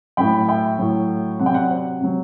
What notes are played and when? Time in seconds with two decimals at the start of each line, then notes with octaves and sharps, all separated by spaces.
0.17 A2 F#3 G5 B5
0.48 E5 G5
0.79 A2 F#3
1.39 C3 F#3 F#5
1.46 G5
1.54 D5 F#5
1.70 C5
2.01 C3 F#3